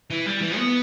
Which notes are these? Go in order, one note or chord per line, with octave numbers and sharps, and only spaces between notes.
E3
G3
E3
B3